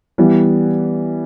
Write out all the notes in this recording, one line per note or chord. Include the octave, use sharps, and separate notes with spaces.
E3 G3 B3